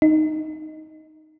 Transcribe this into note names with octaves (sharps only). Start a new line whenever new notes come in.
D#4